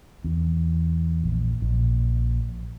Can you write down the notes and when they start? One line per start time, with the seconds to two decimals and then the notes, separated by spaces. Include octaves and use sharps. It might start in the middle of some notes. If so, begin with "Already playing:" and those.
0.24 E2
1.24 A#1
1.62 A#1